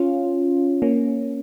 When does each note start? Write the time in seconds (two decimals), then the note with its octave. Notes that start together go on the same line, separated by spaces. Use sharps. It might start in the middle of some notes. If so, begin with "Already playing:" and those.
Already playing: C#4 F4
0.82 A#3 C#4